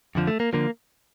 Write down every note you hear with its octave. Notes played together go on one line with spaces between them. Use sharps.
F2 D3 F3
A3
A#3
D3 F3 A#3